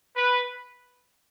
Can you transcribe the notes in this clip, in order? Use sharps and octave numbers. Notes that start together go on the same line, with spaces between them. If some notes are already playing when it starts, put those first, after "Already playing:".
B4